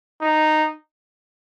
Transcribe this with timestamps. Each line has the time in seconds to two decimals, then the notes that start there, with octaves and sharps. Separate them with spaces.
0.21 D#4